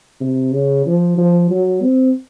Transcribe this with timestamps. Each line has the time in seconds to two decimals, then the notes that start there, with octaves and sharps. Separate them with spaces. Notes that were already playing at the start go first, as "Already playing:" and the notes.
0.21 C3
0.53 C#3
0.86 F3
1.17 F3
1.50 F#3
1.82 C4